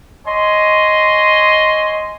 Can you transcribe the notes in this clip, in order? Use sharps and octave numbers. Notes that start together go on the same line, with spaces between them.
C#5 D#5 G#5 C6